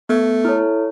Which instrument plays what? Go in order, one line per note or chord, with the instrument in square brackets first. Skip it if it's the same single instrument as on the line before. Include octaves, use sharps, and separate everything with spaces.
[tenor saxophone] A3 [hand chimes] B3
[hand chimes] E4 A4 C#5